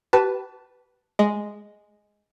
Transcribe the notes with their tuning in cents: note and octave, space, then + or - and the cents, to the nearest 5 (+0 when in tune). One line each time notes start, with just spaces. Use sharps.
G4 -40 B4 +0 A5 +0
G#3 +0 D#5 +0